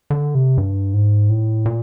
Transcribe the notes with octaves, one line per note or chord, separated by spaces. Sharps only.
D3
C3
G2
G#2
A2
A#2